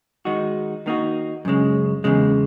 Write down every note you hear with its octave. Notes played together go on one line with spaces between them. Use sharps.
D#3 G#3 D#4 F#4
D#3 A#3 D#4 F#4
F#2 C#3 G#3
E2 C#3 G#3